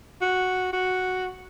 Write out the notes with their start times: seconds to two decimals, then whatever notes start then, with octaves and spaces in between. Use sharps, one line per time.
0.21 F#4
0.73 F#4